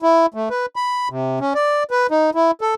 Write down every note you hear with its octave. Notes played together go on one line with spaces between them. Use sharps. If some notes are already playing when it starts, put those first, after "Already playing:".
E4
A3
B4
B5
C3
C#4
D5
B4
D#4
E4
A4